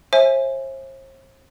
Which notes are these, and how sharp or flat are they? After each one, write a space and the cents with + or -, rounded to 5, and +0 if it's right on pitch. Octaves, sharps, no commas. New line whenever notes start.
C5 +40 E5 +0 G#5 +5